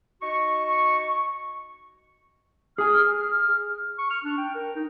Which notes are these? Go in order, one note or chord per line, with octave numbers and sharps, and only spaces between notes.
D#4 F#4 C#6
G#4 G#5 F6
C#6
F6
D4
G5
A#4
D#4